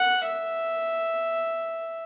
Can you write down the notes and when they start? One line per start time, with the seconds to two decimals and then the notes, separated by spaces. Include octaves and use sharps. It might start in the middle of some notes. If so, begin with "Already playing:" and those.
Already playing: F#5
0.26 E5